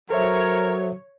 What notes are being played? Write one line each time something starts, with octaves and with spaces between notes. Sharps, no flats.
F#3 A4 A#4 C5 C#5 E5